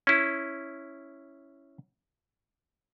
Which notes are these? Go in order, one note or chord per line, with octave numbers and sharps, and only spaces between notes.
C#4 E4